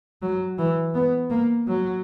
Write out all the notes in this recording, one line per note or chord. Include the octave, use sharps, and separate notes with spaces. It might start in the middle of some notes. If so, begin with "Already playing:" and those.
F#3
E3
B3
A#3
F#3